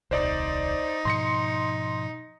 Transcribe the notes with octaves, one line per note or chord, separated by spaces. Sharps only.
D#1 C2 D#4 C5 D5
G#2 B2 F3 C6 A#6 C#7